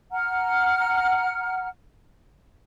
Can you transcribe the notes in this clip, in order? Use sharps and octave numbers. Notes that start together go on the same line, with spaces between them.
F#5 A#5 F6